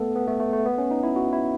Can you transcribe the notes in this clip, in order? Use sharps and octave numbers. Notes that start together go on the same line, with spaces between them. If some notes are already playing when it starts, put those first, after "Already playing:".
Already playing: A3 B3 A4
B3
A3
A3
A3
B3
C#4
D#4
E4
F#4
E4